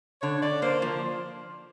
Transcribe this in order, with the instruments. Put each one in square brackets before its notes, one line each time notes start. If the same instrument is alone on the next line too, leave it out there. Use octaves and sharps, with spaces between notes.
[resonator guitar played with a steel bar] D3 [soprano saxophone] C#5
[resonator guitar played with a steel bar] D3 [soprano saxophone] D5
[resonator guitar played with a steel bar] A#3 [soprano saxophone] C5
[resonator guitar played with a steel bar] F3